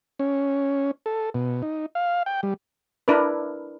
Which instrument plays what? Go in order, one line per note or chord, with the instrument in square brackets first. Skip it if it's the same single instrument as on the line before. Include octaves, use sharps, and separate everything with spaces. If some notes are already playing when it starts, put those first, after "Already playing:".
[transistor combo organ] C#4
A4
B2
D#4
F5
G5
G3
[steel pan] D4 E4 A#4 B4